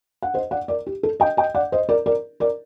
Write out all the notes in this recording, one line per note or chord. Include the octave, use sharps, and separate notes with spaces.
F#5
C5 D#5
D5 F#5
A#4 D5
G4
A4
D#5 G5
D#5 G5
D5 F#5
C5 D#5
A#4 D5
A#4 D5
A#4 D5